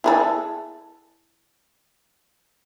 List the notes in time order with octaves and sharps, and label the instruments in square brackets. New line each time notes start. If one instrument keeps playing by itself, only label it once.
[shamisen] E4 G#4 A4